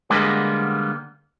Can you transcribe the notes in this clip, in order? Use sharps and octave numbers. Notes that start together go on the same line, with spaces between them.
D3 G3 G#3 A#3 B3